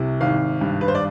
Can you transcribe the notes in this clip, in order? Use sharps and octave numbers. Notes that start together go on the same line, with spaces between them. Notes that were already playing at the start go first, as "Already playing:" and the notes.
Already playing: C2 C3
G#1 F5
G2
B4
C5
D5